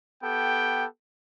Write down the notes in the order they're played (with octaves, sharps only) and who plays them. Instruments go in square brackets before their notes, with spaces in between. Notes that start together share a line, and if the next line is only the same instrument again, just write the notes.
[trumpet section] B3 G4 A4 G5